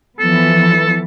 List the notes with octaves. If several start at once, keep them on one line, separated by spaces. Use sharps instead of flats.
E3 F3 B3 A4